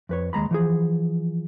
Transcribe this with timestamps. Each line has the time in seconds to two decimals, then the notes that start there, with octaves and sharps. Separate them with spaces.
0.09 F2 B4 C#5
0.33 D#2 G#3 A#5 B5
0.51 E3 F3 G#4